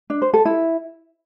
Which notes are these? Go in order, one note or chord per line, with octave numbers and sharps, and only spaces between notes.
D4
C5
A4
E4